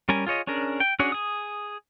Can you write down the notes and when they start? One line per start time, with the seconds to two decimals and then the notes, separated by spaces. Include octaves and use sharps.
0.09 G3 C#4 A#4 G#5
0.27 F4 G#4 C#5 D#5
0.47 C#4 D4 G#4 A#4
0.80 G5
0.99 C#4 D4 F#4 G#4 C#5
1.12 G#4 D#6